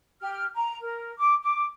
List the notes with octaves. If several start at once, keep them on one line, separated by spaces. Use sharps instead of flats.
G4 F6
A#5
A#4
D6
D6